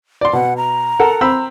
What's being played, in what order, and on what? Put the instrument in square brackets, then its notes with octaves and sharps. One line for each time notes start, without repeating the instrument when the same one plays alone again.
[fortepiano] D5 C6
[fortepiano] B2 [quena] F#5
[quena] A#5
[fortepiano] A4 A#4 F#5
C4 B5 E6